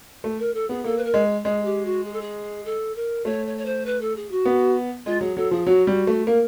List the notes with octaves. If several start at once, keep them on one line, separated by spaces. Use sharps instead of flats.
A3
A#4
A4
B3 G#4
A#3 A4
B4
A#4
G#3
G#3 G#4
G4
F#4
G#4
A4
G#4
A4
A#4
A3 C#5
C#5
C#5
C5
B4
A4
G#4
F#4
B3
G#3 F4
F#3 G#4
F#3 A4
F3 G#4
F#3 F#4
G3
A3
A#3 A#4